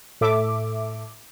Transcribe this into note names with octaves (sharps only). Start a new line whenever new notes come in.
A2 A4 E5 D6